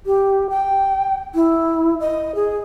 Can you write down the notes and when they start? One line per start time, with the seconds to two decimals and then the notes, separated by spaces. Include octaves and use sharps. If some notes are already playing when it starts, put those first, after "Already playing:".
0.06 G4
0.50 G5
1.35 E4
2.00 D#5
2.35 G#4